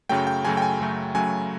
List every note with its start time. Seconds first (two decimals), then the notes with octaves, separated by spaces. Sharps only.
0.09 F#2 C#3 F#3 A3 G5
0.27 G5
0.45 F#2 C#3 F#3 A3 G#5
0.57 G5
0.62 G#5
0.79 F#2 C#3 F#3 A3
1.15 F#2 C#3 F#3 A3 G#5